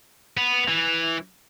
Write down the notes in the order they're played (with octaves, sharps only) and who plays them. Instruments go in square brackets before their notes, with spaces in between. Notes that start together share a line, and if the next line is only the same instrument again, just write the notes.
[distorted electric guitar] B3 [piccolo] F7
[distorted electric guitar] E3